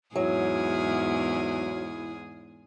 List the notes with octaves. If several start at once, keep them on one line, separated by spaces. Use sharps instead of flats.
E2 G#2 F#3 E4 G#4